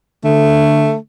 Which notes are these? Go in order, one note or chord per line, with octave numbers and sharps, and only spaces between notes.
D3 A3